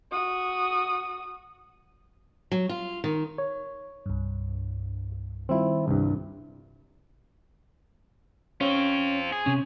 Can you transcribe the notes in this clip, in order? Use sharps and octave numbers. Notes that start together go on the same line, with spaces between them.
F#4 D#6
F#3
F4
D#3
C#5
C2 G2
D#3 G3 C4 E4 F4
C2 G2
C4 C#4 F4 C5 C#5
G#4
C3 C#4